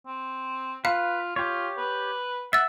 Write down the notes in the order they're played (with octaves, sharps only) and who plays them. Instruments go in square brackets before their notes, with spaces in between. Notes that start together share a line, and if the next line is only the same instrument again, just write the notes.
[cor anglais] C4
[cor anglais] F4 [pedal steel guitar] B4 [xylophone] F5
[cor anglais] F4 [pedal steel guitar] G4 C#5
[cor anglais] B4
[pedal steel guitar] E5 [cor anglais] F#5 [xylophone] E6 A6